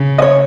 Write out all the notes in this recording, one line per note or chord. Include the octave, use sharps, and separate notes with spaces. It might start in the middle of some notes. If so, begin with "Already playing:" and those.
Already playing: C#3
D#5
C#5